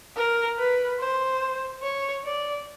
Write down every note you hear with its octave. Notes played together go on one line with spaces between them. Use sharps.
A#4
B4
C5
C#5
D5